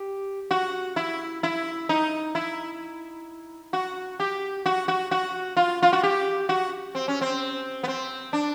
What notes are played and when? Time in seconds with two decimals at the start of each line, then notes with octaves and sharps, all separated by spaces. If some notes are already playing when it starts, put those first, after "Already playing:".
Already playing: G4
0.51 F#4
0.96 E4
1.43 E4
1.89 D#4
2.35 E4
3.73 F#4
4.20 G4
4.66 F#4
4.88 F#4
5.11 F#4
5.57 F4
5.83 F4
5.93 F#4
6.03 G4
6.49 F#4
6.95 C4
7.08 C#4
7.21 C4
7.83 B3
7.88 C4
8.33 D4